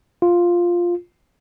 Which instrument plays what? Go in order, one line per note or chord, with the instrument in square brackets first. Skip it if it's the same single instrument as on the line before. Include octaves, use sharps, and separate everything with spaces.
[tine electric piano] F4